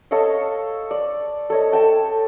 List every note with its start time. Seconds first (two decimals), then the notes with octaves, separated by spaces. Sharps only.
0.11 A4 C#5 D#5 F5
0.91 D5
1.50 A4 C#5 D#5
1.72 A4 G5 A5